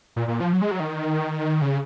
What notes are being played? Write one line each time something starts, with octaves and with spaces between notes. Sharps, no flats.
A#2
A#2
F3
F#3
G#3
F#3
D#3
C#3